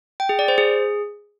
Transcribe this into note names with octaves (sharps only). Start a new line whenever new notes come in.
G5
G#4
D5
C5
G#4